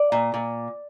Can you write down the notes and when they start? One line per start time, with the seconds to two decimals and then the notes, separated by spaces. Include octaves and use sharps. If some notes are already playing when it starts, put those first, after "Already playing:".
Already playing: D5
0.12 A#2
0.34 A#2